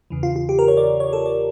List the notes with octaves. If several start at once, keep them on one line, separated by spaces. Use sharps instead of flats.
E2 C#3 E3
F4
F4
G4
A#4
C#5
D5
C#5
A4
D5